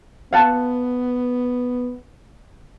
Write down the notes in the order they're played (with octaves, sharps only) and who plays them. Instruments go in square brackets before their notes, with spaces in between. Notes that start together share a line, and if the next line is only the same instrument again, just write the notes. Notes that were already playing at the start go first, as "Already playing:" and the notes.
[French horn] B3 [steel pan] F5 F#5 A5